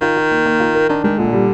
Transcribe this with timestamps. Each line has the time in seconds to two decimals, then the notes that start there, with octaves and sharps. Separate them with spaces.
0.01 D#3 F4
0.17 F4
0.31 A#3
0.46 A#3
0.60 F4
0.75 A#4
0.89 D#3 D4
1.04 D#3 G#3
1.19 A#2 D3
1.33 G3